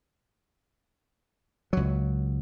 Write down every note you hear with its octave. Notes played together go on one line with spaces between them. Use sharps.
C#2 F#3